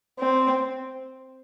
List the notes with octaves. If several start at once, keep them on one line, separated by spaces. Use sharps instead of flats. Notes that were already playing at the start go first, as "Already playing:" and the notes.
C4